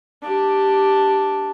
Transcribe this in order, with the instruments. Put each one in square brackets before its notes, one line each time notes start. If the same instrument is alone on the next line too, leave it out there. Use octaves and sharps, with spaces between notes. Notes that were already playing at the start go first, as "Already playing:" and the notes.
[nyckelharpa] D4 G4